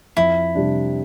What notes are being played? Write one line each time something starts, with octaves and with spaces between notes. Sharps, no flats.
F2 E4
C3 G3 D4